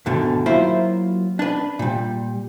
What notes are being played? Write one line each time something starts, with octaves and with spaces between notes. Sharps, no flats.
D2 G#2 B2 D3 D#3
F#3 A#3 E4 F4 C5
D4 B4
A#2 G3